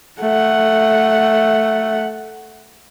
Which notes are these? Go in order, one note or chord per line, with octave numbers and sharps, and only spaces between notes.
A3 F#5